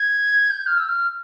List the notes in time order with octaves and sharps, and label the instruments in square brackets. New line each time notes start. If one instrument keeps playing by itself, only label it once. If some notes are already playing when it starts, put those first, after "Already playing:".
Already playing: [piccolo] G#6
G6
F6
E6
F6